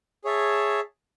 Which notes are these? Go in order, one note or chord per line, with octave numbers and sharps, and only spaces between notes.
G#4 C#5 E5 A5